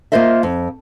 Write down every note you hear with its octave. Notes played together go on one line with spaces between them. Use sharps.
A#3 F4 A#4 C5 D#5 E5
F2